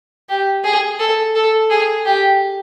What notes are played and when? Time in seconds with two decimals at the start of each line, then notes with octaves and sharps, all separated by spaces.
0.29 G4
0.64 G#4
1.00 A4
1.35 A4
1.70 G#4
2.05 G4